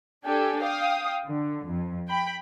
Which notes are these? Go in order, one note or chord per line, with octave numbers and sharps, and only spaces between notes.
D4 G4 A4 G#5
F5 G5 D#6
D3
F2
G5 B5